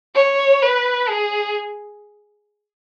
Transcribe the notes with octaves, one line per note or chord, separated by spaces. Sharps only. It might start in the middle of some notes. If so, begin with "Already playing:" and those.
C#5
B4
G#4